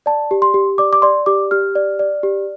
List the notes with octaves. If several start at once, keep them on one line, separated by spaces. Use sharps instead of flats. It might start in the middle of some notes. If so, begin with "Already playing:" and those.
D5 A5
G4
C6
G4
D5 D6
D6
D5 C6
G4 D6
G4 F6
D5
D5
G4